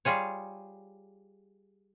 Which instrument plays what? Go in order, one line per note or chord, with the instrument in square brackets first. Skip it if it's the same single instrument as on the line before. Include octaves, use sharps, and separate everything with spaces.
[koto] G3 F4 G#4 C#5